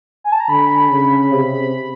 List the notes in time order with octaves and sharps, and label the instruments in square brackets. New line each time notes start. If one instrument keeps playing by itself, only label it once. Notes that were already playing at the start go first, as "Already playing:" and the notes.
[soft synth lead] G#5
A5
A#5
[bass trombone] D3 [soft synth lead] B5
[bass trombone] C#3
[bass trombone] C3 [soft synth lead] B5